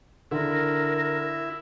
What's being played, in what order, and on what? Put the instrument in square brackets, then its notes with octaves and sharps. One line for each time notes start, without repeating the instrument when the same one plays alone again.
[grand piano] D3 [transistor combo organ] E4 [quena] A#4